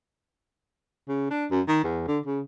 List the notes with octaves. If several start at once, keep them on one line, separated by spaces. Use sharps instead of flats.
C#3
D4
F#2
D#3
E2
D3
C#3